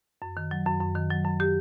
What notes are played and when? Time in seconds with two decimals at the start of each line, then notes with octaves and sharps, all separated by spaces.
0.22 F#2
0.37 D#3
0.51 F#3
0.66 F#2
0.81 F#2
0.95 D#3
1.10 F#3
1.25 F#2
1.40 G4